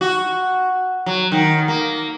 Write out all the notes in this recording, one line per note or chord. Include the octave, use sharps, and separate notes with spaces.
F#4
F#3
D#3
A#3